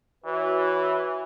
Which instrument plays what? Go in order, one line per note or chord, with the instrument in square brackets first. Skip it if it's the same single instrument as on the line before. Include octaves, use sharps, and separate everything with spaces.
[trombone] E3 [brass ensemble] F#4 B4 C#5